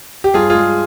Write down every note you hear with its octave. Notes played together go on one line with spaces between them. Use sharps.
G4
G2 F4 G#4
F4 G#4
G#3